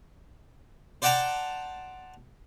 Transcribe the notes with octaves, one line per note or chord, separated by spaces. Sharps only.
C5 D5 F#5 G5 A5 A#5